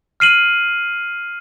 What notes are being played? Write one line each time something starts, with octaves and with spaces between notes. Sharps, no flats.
F6 C7 D#7 F#7